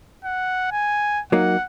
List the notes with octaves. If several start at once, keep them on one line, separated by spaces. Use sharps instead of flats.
F#5
G#5
F#3 A#3 D#4 F#5